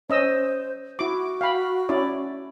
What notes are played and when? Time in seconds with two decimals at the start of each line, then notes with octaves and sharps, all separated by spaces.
0.10 C#4 C5 D#5 E6
0.99 E4 F#4 D6
1.41 F5 G5 B5
1.89 C#4 E4 D5